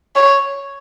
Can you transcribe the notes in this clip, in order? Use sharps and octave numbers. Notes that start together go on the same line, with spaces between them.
C#5